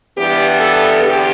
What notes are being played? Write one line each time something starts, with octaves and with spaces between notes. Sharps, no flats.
G2 E3 G3 B3 G4
A4
E2 D3 G4